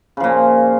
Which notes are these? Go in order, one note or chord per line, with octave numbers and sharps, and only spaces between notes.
A#2 C#3 F3